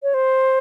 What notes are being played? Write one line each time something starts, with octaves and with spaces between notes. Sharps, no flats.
C#5
C5